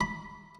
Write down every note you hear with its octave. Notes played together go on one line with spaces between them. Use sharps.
B5